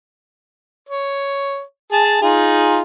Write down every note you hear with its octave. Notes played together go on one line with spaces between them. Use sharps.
C#5
G#4 A5
D#4 F4 G#4